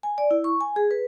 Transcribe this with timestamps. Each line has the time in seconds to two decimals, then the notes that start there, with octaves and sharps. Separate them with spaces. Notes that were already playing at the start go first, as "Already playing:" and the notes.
0.03 G#5
0.18 D5
0.31 E4
0.44 C#6
0.61 G#5
0.76 G#4
0.91 B4